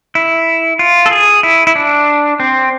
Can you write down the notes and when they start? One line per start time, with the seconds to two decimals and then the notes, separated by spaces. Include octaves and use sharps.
0.15 E4
0.79 F4
1.06 A4
1.11 G#4
1.43 E4
1.67 E4
1.75 D4
2.40 C4